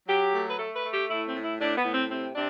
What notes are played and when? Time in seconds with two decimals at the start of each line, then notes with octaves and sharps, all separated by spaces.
0.07 F#3 G4
0.32 A3
0.48 B4
0.57 A3 A4
0.74 B4
0.84 A3
0.91 G4
1.08 A2 E4
1.26 C4
1.34 A2
1.42 E4
1.58 A2 D4
1.76 B3
1.84 A2
1.93 C4
2.09 C3 C4
2.34 C3 D4